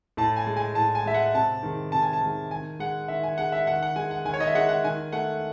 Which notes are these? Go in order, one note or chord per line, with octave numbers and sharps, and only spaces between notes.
A2 A5
G#5
G#3
G#5
A2 A5
G#5
G#3 E5
F#5
C3 A5
D#3 G#3
C3 A5
G#5
A5
D#3 G#3
D#3 G#5
G#3 F#5
D#3 E5
G#5
G#3 F#5
E5
D#3 F#5
F#5
G#3 G#5
F#5
D#3 G#5
C#5
D#5
E5
G#3 F#5
F#5
D#3 G#5
A3 F#5